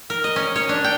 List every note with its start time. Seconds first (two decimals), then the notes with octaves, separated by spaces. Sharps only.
0.10 A#4
0.24 D#5
0.36 C#4
0.56 C#5
0.69 D4
0.84 G5